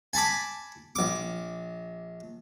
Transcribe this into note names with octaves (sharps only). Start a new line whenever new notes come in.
G#5 A5 B5 D6
A#1 D6